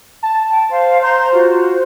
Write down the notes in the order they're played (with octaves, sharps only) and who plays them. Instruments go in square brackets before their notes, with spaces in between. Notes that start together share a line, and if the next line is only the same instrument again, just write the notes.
[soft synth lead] A5
[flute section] G5
C5 F5 C6
[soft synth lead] C5 [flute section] A#5 C6 G6
[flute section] F4 F#4